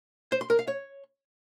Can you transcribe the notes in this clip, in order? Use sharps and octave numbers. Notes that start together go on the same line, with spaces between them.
C5
C6
A#4
F5
C#5